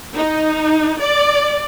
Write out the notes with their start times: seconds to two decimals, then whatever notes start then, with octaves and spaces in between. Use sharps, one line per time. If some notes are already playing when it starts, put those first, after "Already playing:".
0.16 D#4
1.00 D5